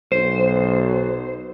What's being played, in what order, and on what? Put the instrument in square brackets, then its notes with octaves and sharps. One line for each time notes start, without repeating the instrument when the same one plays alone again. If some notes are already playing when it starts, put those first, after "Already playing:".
[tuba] B1 [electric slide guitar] C5